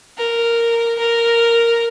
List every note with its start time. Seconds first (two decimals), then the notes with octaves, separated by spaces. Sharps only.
0.17 A#4
0.98 A#4